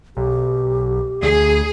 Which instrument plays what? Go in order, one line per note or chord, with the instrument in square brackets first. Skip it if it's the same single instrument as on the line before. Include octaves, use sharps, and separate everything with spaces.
[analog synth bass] B1 [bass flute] G4
[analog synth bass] D2 [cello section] G#4